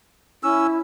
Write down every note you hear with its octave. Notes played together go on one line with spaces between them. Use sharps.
C#4 E4 E6